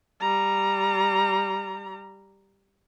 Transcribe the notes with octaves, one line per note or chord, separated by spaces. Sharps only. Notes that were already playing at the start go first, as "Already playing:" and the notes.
G3 A#5